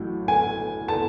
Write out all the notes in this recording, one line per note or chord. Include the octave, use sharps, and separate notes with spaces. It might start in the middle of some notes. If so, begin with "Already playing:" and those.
Already playing: A1 A2 F#3
G#5
A5